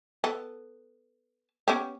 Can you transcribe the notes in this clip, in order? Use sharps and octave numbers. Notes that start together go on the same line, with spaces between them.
B3 A4
B3 C#4 G4